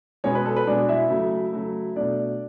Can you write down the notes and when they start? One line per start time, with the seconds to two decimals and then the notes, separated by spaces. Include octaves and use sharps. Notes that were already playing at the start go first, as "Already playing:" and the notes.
0.24 B2 G#3 B3 C#4 C#5
0.35 B4
0.46 A4
0.56 B4
0.67 B2 G#3 B3 D4 D5
0.89 E4 E5
1.10 C#3 F#3 A3
1.53 C#3 F#3 A3
1.96 B2 A3 D4 D5